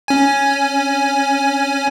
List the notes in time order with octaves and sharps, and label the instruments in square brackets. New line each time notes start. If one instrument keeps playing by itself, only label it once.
[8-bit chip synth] C#4 G#5